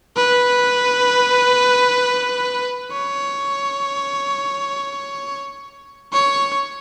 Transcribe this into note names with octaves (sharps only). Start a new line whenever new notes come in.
B4
C#5
C#5